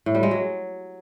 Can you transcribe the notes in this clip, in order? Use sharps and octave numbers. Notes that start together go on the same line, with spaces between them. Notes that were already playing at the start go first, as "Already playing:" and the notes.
A2
G3
G#3
F#3